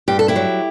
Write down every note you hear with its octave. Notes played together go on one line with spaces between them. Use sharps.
G2 G4
A4
E4 G4
F#3